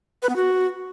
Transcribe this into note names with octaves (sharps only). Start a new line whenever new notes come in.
B4
B3
F#4